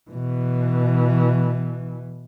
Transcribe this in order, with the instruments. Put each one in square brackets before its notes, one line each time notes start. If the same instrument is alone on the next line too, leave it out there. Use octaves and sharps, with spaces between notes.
[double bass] B2 E3